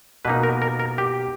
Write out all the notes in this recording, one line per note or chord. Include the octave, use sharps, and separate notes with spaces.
B2 A#3 D#4 B4
A#4
A#4
A#4
G4